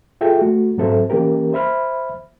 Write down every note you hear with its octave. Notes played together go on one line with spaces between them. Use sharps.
F4 G#4 A4 E5 G5
A3 F#4
G#2 F#3 C4 A4 C5 E5
E3 A#3 C#4 G4 A#4
C5 E5 B5 F6